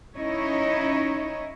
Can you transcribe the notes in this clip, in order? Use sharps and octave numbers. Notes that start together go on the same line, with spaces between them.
C#4 D#4 E4 C#5 D#5